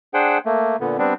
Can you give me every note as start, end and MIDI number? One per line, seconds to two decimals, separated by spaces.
0.14 0.38 62
0.14 0.38 68
0.14 0.38 72
0.14 0.38 78
0.14 0.38 79
0.45 0.76 57
0.45 0.76 58
0.80 0.97 46
0.80 0.97 50
0.80 0.97 59
0.98 1.14 55
0.98 1.14 59
0.98 1.14 60
0.98 1.14 62